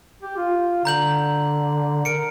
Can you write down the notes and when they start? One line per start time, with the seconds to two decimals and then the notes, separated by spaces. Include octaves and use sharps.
0.23 G4
0.37 F4
0.85 D3 A#5 G6 F#7
2.05 A#4 C#7 D7